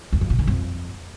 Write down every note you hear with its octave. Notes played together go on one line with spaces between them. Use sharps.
E2
F2
B2
D3
F2